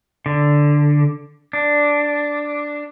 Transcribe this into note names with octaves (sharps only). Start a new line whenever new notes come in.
D3
D4